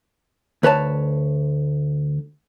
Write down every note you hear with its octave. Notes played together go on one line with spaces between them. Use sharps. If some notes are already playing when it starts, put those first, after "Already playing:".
D2 B4 C#5 A5